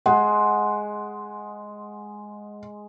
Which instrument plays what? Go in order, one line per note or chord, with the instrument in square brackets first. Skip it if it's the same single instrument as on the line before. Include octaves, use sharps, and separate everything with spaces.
[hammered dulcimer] G#3 [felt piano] F#5